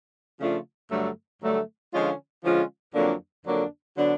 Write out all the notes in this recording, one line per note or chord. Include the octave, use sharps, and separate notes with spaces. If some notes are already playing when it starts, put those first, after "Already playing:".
C#3 F3 A3 D4 F4
G2 D3 F#3 A3
G2 D3 F#3 A3
D3 F3 G#3 C#4 F4
D3 F3 G#3 C#4 F4
F2 D3 F#3 A#3 D4
F2 D3 F#3 A#3 D4
D3 F#3 B3 D4